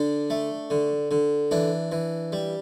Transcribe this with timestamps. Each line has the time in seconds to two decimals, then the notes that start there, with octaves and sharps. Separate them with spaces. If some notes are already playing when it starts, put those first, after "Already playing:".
Already playing: D3 D4
0.30 A3
0.70 D3
1.11 D3
1.51 E3 D4
1.92 E3
2.32 G3